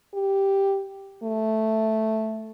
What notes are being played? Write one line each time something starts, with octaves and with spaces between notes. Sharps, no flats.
G4
A3